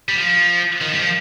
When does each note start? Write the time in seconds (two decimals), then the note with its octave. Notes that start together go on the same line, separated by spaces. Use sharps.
0.09 G3
0.16 F3
0.81 D#3
0.92 G3
0.97 F3